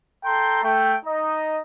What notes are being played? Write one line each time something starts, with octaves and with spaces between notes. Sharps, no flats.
A4 G5 A#5 C6
A3 G5
D#4 D#5